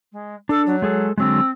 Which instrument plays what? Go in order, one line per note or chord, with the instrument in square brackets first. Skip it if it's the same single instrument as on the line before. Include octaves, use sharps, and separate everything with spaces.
[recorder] G#3
[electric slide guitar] D4 [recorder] A4
[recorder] F#3
[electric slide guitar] G#3 G#4 A4
[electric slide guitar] D3 F#3 G#3 [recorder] C4